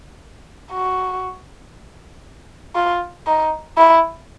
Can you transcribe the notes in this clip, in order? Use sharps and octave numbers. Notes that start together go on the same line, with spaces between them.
F#4
F4
D#4
E4